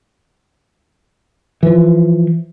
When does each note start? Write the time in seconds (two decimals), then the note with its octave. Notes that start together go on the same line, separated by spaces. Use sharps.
1.63 E3 F3